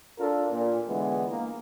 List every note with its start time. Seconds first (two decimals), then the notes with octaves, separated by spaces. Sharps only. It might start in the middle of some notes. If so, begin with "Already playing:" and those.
0.19 D4 F4 A4 A#4
0.51 A#2
0.87 D3 E3 G#3 B3
1.29 A#3